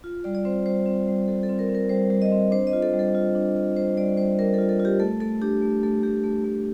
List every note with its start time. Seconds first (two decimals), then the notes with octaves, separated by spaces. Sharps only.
0.04 F4
0.24 G3 D5
0.35 D5
0.45 C4 C5
0.66 G3 C5
0.86 C4
1.07 G3
1.28 G3 A4
1.43 A4
1.49 C4
1.59 A#4
1.69 C4
1.75 A#4
1.89 G3 C5
2.10 G3
2.22 D#5
2.32 C4
2.51 D4 C5
2.67 D#5
2.73 F4
2.82 A4
2.94 G3
2.99 A4
3.15 F4
3.35 D4
3.56 F4
3.76 G3 C5
3.97 G3 D5
4.17 G3 C5
4.39 G3 A#4
4.53 F4 A4
4.69 A4
4.80 F4
4.85 G4
5.00 A3 A4
5.20 A3 A4
5.42 D4 G4
5.62 A3
5.83 A3 A4
6.03 A3 G4
6.24 A3
6.44 A3